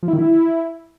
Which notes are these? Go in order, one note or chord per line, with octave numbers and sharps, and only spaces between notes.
F3
E4
D#3
E4